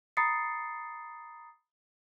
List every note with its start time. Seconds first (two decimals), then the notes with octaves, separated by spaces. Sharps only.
0.17 A#5 B5 D#6 A6 C7 C#7